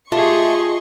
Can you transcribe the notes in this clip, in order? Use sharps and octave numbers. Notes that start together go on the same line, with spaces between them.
A3 F4 G4 G#4 D#5 C6 C#6